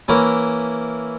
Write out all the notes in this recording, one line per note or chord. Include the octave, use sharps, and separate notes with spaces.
E3 A#3 C#4 E4 A#4